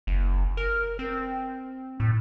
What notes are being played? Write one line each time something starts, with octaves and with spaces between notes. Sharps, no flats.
F#1
A#4
C4
A2